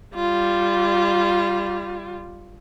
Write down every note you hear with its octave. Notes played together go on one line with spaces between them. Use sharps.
G3 F4